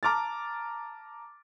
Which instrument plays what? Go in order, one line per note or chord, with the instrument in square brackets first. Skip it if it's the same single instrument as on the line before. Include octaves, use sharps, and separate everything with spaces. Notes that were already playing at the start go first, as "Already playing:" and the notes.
[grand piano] A5 A#5 D6 F6 A6